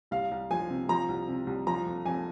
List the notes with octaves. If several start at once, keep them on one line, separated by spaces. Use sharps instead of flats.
C2 F5
C2
F3 G#5
C3
F3 A#5
C2
C3
C2
F3 A#5
F2
F2 G#5